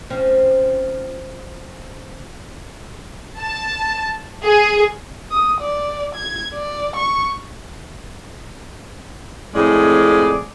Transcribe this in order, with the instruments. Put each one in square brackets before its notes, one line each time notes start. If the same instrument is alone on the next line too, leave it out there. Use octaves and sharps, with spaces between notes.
[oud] F3 C4 C#4
[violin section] A5
G#4
[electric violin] D#6
D5
G#6
D5
C#6
[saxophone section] F2 A2 G#3 C4 G#4 D5